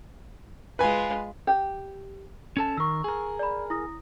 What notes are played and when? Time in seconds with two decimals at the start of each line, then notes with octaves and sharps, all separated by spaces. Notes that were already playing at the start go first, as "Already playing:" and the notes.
0.79 G#3 F4 B4 G#5
1.47 G4
2.57 C#4 A4 A5
2.77 D#3 A#4 C#6 E6
3.04 G#4 A#4
3.39 D5 B5
3.70 E4 D#6 A#6